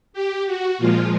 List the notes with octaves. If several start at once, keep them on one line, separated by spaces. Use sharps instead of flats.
G4
F#4
A#2 F3 G#3 F4